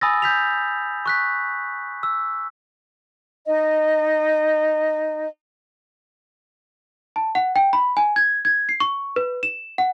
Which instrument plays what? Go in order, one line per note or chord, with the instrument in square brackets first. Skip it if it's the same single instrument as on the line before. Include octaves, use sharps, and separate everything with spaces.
[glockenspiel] G#5 B5 D#6 E6 A6 A#6
G6 B6 F7
C#6 F#6 B6
E6
[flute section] D#4 D#5
[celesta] A5
F#5
G5
B5
G#5
G#6
G#6
C7
C#6
B4
E7
F#5